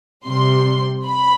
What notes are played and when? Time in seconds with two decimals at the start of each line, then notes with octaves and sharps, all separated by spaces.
0.25 C3 G3 C6
1.06 B5